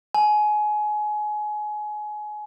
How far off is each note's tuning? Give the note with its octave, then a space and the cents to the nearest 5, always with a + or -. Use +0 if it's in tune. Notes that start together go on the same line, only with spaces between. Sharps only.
G#5 +25